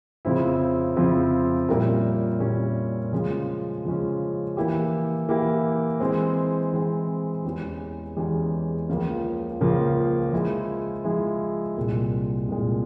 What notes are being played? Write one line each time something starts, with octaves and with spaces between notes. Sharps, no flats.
F2 C#3 F3 C4 E4
F2 C#3 F3 C4 E4
A#2 G3 C#4 E4 A#4
A#2 G3 C#4 E4 A#4
C#3 F3 G#3 C#4
C#3 F3 G#3 C#4
E3 A#3 E4 G4
E3 A#3 E4 G4
E3 G#3 C4
E3 G#3 C4
E2 E3 G#3 C#4 G4
E2 E3 G#3 C#4 G4
C#2 C#3 F3 A#3
C#2 C#3 F3 A#3
F3 G#3 E4
F3 G#3 E4
C2 A#2 G#3
C2 A#2 G#3